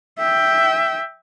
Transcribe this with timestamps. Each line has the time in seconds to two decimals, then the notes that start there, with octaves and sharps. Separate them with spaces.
0.19 E5 G5